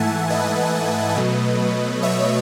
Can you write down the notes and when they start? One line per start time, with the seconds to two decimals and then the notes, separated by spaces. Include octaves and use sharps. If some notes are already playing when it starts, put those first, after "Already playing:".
Already playing: G#2 E3 A3 E5 F#5 G#5 A5
0.30 B4 D#5
1.17 B2 F#3 A3
2.02 C#5 E5